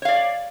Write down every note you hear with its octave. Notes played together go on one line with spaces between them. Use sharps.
C#5 D5 F5